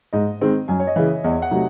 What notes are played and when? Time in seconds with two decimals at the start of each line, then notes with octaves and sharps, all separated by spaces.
0.13 G#2 D#5
0.41 D#3 G#3 C4
0.68 F#2 G#5
0.80 C#5
0.87 D#5
0.96 C#3 E3 E5
1.24 E2 D#5
1.42 F#5
1.51 C3 F#3 A3 D#4